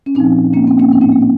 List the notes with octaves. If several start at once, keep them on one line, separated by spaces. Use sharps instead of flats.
C#4
A#2 F3 C4 D#4
A#3 C#4
C4
A#3 C#4
A2 F3 C4 D#4
A#3 C#4
A#3
C4